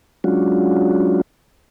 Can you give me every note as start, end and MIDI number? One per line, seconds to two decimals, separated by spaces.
0.24 1.22 54
0.24 1.22 56
0.24 1.22 61
0.24 1.22 62
0.24 1.22 65
0.24 1.22 66